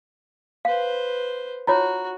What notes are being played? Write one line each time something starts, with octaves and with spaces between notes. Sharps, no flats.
B4 C5 F5
D#4 F4 F#4 C#5 A#5